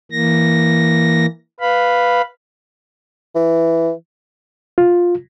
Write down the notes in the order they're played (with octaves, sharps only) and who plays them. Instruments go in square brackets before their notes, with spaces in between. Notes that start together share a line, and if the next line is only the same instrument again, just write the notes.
[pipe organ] E3 A#3 A#6
B4 F5 B5
[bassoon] E3
[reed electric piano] F4